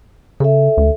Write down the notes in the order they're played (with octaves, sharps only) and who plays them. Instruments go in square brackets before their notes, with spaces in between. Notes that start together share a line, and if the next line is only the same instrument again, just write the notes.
[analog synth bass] C#3 [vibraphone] A4 E5
[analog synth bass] D2